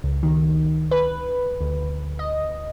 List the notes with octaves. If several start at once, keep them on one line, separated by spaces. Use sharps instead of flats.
C#2
D#3
B4
D2
D#5